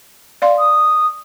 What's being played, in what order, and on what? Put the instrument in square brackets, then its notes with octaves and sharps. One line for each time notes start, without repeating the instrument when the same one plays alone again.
[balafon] D5 F5 C6
[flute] D#6